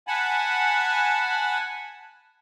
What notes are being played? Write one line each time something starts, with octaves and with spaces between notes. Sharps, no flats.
F#5 G#5 A5 B5